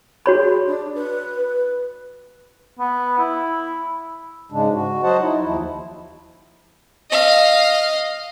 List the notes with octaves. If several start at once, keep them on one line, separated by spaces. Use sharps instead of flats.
F#4 G#4 C#5 B5
D4
B4
B3
E4
G#2 C#3 G#3 D4
F#4
F#3 F#4 C5 D#5 F#5 A5
D#4 E4
D#2 F3 E4
D#5 F5